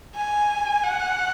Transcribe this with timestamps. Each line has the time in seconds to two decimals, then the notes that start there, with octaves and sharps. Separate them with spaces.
0.16 G#5
0.84 F#5